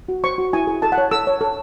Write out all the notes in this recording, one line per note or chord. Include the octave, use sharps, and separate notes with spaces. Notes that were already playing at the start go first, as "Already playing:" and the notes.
F#4
C5 C#6
F#4
E4 G#5
G#4
A4 A5
F#5
C#5
A4 E6
C#5
A4